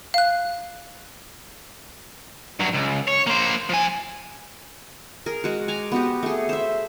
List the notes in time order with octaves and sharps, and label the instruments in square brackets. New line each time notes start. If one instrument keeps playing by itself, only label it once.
[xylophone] F5 F#6
[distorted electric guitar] G2 F#3
C#2
C#5
A#3 C5
F3 G#5
[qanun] G#4 A#4
G#3 F#4
G#5 A#5 D6
B3 F#4 G4
A3 G#4
C5 E5